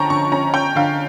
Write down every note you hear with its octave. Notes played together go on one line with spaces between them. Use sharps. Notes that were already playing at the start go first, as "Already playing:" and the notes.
Already playing: D3 F3 C#4 G5 A5 A#5 C#6
D3 C#6
C#4 A#5
C#4 G5
D3 F5